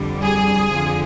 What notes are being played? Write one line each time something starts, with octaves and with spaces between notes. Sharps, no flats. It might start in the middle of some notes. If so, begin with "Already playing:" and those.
Already playing: F2 D3 G3
G#4
F2 D3 F3